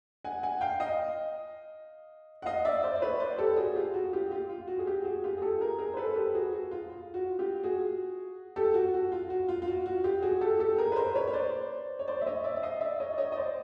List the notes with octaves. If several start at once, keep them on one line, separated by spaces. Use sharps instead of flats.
F#5 G#5
F#5 G#5
F5 G5
D#5 F5
F#5
D#5 F5
D5 E5
C5 D5
D5
B4 C#5
C5 D5
G4 A4
F#4 G#4
F4 G4
F#4
F4 G4
F4 G4
F4
F#4
G#4
F4 G4
F#4 G#4
F4 G4
G#4
G4 A4
G#4 A#4
G#4 A#4
C5
A4 B4
G4 A4
F#4 G#4
F#4
F4
F4
F#4
F4 G4
F#4 G#4
G4 A4
F#4
F#4
F4
F#4
F4
F4
F#4
F#4
F4 G4
F#4 G#4
G4 A4
G4 A4
G#4 A#4
B4
A#4 C5
B4 C#5
C#5
C5 D5
C#5
C5 D5
E5
C#5 D#5
D5 E5
E5
D#5 F5
D5 E5
C#5 D#5
D5
C#5 D#5
D#5
C5 D5